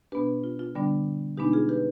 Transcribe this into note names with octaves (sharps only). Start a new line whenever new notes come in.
B2 B3 D4 G4 B4
F4
F4
D3 G3 B3 D4
B2 G#3 B3 D4 D#4 G4
F4 G#4
G4 B4